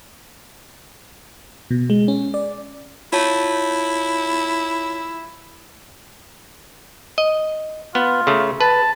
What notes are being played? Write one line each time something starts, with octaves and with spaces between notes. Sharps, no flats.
B2
G#3
C#4
D5
E4 F4 C#5 A5
D#5
B3 F4
C#3 A3
B4 A5